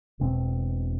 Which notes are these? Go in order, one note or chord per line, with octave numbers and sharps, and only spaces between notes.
E1 B2 C4